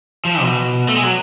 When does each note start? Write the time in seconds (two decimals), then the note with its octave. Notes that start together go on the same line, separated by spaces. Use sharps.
0.25 F3
0.41 B2
0.88 A3
0.96 G#3
1.03 F#3